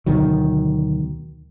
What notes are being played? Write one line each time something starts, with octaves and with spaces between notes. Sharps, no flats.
D2 B2 D#3 F#3